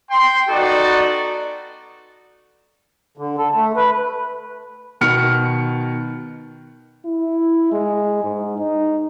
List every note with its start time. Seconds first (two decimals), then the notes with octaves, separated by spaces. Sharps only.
0.10 G5 C6
0.49 B3 D#4 F#4 A4 D5
3.17 D3
3.38 A4
3.55 A3
3.76 B4
5.01 B2 D#3 F6 C#7
7.06 E4
7.72 G#3
8.23 G#2
8.58 D#4